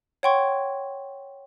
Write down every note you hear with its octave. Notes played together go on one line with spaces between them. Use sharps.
C#5 F#5 G5 C6 C#6 G#6